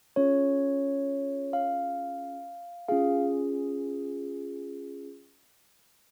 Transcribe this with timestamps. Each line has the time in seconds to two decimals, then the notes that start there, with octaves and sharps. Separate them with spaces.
0.16 C#4 F4 G#4 C#5
1.53 F5
2.88 C#4 F4 G#4 F5